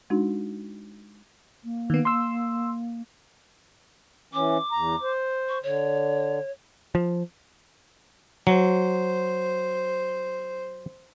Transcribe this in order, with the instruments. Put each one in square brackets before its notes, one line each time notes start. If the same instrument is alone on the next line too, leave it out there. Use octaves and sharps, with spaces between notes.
[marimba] G#3 D4 D#4 F#4
[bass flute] A#3
[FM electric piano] D#3 B3
C6 E6
[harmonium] E3 C#4 [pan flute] D6
[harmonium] E2 A#5
C5
[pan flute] C#6
[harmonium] D3 [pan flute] C#5
[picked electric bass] F3
[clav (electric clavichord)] F#3 [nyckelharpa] C5